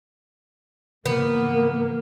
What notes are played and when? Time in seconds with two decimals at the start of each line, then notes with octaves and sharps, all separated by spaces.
1.06 G#2 C#3 E3 F3 A#3 B3 A#4